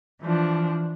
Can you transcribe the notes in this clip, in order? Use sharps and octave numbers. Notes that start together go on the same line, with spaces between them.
E3 F3 D4